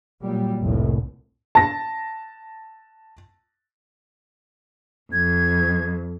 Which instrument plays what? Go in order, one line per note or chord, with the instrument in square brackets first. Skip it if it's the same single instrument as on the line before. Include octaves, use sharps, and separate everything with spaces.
[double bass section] A#2 F#3 G3
F1 C2 A2
[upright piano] A5 A#6
[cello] F2 [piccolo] G#6